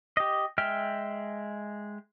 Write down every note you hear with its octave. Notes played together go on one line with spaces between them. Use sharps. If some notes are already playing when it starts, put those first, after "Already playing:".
G4 D#5
G#3 E5 G5 F6